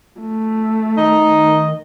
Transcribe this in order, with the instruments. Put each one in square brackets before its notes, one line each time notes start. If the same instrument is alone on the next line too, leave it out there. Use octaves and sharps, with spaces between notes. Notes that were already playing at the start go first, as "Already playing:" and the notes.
[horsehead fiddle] A3
[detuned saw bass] D#3 [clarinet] D#4 [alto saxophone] D#5